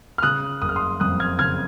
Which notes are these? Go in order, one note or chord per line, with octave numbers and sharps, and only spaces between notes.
F6
C#3 D#6 F#6
F#1 D#6
F6
C6 D#6
F2 D#6 F#6
F6 G#6
C#3 F6 G#6